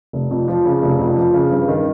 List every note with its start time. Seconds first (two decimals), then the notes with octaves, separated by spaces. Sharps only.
0.13 F1
0.31 F2
0.48 F3
0.66 C#3
0.82 F1
0.99 F2
1.17 F3
1.34 C#3
1.51 G2
1.68 D#3